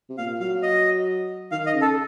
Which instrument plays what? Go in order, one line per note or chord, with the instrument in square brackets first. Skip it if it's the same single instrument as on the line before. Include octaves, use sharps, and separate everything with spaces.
[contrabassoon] C3
[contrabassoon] A#2 [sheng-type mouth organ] F5
[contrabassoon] F#3 [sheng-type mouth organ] F5
[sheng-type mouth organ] D#5
[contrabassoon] D#3 [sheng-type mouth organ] F5
[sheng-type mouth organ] D#5
[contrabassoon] C#3
[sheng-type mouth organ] A4